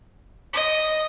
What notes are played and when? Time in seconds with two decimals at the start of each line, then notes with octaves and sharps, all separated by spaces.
0.53 D#5